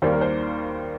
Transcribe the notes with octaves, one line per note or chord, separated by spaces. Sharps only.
D#2 D#3 G3 A#3 C5
A#4
C5